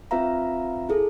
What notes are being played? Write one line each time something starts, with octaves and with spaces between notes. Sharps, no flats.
C4 F4 B4 E5 F5 A#5
E4 G#4 A4